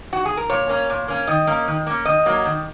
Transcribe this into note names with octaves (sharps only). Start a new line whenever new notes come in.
F#4
G#4
A#4
A#2 C#5
A#3 C#4
A#2
A#3 C#4
D#3 D#5
A#3 C#4
D#3
A#3 C#4
D#3 D#5
F#3 A#3
D#3